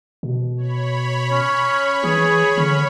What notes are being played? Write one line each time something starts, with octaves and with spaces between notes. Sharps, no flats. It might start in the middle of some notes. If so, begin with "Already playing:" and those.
B2
C#5 B5
C#4
E3 G#4
D3 C#4